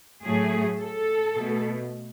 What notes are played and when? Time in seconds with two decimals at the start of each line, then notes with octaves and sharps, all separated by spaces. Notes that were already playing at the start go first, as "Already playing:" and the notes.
0.24 A2 F#3 A3 G#4
0.80 A4
1.34 B2 A3